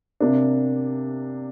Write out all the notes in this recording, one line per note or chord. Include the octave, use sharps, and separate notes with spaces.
C3 A#3 D4